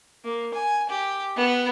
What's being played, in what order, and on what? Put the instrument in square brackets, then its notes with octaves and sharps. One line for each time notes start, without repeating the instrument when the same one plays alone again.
[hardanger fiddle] A#3
G#5
G4
B3